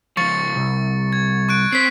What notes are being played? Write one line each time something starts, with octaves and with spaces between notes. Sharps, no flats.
C#2 F3 C#6 A6 C#7
C2
G#6
C#6 F#6 D7
C4 C5 B6 C7